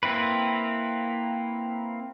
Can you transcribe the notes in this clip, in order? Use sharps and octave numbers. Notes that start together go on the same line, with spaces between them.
A#3 C4 E4 B4